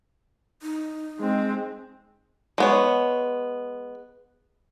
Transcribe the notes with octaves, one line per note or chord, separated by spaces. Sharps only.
D#4
G#3 C4
G#3 B3 C#5